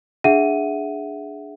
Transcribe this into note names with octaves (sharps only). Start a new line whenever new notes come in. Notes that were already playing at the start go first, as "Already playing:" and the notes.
D4 G#4 E5 F#5 D#7